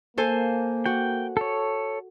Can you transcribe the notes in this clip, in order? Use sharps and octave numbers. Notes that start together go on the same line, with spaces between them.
A#3 A4 C5 G#5
F#4 G5
A4 C#5